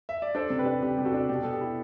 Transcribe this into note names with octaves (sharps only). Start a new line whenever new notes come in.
E5
D5
D4 A4 C5
C3
G4 B4
D4
C3 G4
C3
F#4 A4
D4
B2 G4
B3 A4
G4
E4